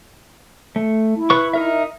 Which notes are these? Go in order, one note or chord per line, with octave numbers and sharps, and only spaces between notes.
A3
E4
B4 C#6
D#4 A#4 E5